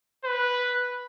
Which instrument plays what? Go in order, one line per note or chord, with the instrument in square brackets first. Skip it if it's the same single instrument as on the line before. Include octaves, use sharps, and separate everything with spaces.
[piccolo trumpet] B4